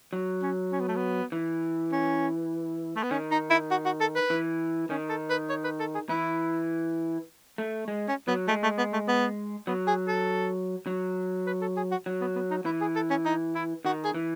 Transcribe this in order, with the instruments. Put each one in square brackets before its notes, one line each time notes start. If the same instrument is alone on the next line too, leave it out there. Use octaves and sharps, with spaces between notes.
[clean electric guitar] F#3
[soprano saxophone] C#4
C#4
B3
A3
B3
[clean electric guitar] E3
[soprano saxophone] C#4
A3
B3
[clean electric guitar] D#3 [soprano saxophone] C#4
[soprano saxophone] D#4
E4
F#4
F#4
A4
B4
[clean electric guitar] E3
[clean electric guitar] D#3 [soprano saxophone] C#4
[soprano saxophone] A4
B4
C#5
B4
A4
G#4
[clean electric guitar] E3 [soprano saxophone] E4
[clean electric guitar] A3
G#3
[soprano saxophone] C#4
[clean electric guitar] F#3 [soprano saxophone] B3
[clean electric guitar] G#3 [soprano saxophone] A3
[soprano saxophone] A3
B3
A3
B3
[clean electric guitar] F#3 [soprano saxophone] B3
[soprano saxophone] G#4
A4
[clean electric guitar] F#3
[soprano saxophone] B4
A4
G#4
F#4
[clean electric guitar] F#3
[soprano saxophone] B3
B3
D#4
[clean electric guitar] E3 [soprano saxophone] E4
[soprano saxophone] G#4
A4
C#4
D#4
E4
[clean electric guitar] D#3 [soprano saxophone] F#4
[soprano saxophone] G#4
[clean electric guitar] E3